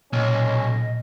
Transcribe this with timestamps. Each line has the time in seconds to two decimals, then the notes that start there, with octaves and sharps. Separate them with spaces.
0.13 B1 A#2 C#4 D#5